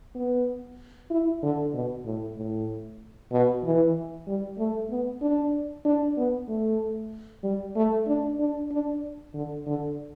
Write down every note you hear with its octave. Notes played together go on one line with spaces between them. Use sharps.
B3
E4
D3
B2
A2
A2
B2
E3
G3
A3
B3
D4
D4
B3
A3
G3
A3
D4
D4
D4
D3
D3